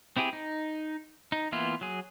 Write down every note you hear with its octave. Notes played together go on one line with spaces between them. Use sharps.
C4 E4 G4 G#4
D#4
D#4
E3 A#3 B3 E4 F4
F#3 G#4